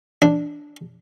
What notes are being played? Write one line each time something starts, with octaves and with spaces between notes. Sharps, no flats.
D4